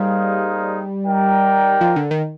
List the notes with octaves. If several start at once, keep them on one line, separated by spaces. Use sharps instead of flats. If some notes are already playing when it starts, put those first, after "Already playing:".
Already playing: G3 A#3 D#4 G#4 C5 F5
D#4 A#4 D5 G5
F3
D3
D#3